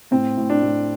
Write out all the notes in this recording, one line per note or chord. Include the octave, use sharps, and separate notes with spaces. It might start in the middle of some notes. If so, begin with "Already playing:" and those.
A2 C4
A2
D4
A2